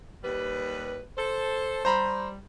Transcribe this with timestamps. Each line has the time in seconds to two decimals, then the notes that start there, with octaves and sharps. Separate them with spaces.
0.23 D#2 G3 B4
1.17 A4 C5
1.85 G3 C5 A#5 B5